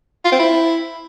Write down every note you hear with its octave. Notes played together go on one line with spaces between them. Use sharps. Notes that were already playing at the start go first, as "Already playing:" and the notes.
F4
C4
E4